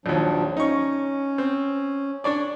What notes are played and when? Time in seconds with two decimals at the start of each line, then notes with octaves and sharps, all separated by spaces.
0.06 A#1 D#2 F3 F#3 D4
0.57 C#4 D#4 C#6
1.38 C4
2.24 D4 C#5 D5